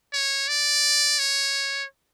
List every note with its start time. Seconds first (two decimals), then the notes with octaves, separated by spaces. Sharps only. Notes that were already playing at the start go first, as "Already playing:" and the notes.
0.13 C#5
0.48 D5
1.19 C#5